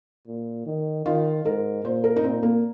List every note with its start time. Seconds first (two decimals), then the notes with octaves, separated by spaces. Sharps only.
0.27 A#2
0.66 D#3
1.06 D#3 F4
1.45 G#2 A#4
1.84 A#2 C5
2.04 A#4
2.16 D#4
2.23 A#2 C4
2.43 A#3